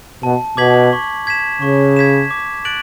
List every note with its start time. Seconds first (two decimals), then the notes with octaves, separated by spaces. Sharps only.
0.23 B2 A5
0.57 B2 D6 G#6 B6 F#7
0.93 C#6
1.27 G#6 B6 E7
1.61 C#3 C#6
1.96 G#6 B6 E7
2.31 D6
2.65 F#6 A6 D7 F#7